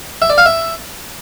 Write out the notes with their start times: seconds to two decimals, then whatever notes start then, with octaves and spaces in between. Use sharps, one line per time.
0.22 E5
0.30 D5
0.38 F5
0.46 E5